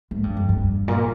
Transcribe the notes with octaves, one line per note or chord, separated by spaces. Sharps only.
G#2
G2
F2
G2
A#2